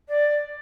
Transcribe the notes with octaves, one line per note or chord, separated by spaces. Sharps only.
D5